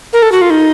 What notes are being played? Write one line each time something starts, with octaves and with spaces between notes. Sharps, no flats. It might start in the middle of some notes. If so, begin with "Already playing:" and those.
A#4
A4
F#4
F4
D#4